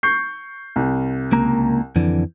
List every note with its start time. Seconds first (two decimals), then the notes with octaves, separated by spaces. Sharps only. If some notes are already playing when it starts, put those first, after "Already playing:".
0.03 C#6 G6 C7
0.76 C2
1.32 C#2 A#3 A#5
1.96 F2 D3 E3